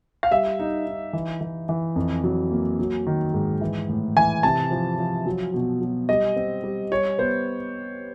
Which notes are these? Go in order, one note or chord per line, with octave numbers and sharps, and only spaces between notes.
F5
G3 E5
D#4
D#4
E3
E3
E3
F2
F#3
A#3
F#3
D#3
G#2
E3
A2
E3 G#5
C3 A5
F3
F3
F#3
B2
F#3
G3 D#5
C4
G3
G3 C#5
B3 C5